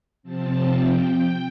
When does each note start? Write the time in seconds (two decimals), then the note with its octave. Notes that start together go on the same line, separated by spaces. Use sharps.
0.23 C3 F3 C4 A5
0.75 G5